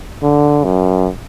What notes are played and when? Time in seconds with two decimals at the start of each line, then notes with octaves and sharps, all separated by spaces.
0.23 D3
0.64 F#2